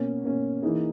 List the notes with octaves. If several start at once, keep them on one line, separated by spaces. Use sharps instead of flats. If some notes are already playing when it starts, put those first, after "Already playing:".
Already playing: B2 A#3 C#4
B2 A#3 C#4
E3 A#3 D#4 G#4